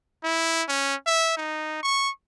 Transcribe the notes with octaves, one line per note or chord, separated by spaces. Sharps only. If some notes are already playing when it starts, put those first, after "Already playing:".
E4
C#4
E5
D#4
C#6